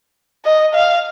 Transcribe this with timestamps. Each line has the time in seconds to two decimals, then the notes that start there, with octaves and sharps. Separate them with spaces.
0.45 D#5
0.75 F5